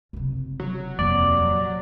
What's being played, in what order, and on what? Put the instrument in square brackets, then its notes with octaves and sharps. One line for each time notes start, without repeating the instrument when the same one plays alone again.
[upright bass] F#1 C3
[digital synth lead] F#3
[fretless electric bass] D#1 F2 C3 [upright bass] A#3 [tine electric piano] D5